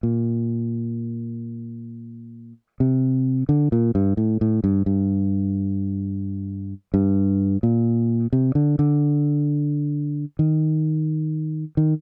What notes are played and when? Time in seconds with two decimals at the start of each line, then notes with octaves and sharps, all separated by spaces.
0.03 A#2
2.80 C3
3.49 D3
3.72 A#2
3.95 G2
4.17 A2
4.41 A2
4.64 G2
4.86 G2
6.94 G2
7.63 A#2
8.33 C3
8.55 D3
8.79 D3
10.39 D#3
11.77 D#3